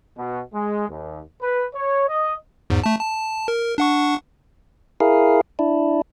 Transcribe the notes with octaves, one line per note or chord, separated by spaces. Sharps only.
B2
G#3
D#2
B4
C#5
D#5
E2 G#2
A3 A5
A5
A#4
D4 F#5 C#6
E4 G#4 A#4 F5
D4 E4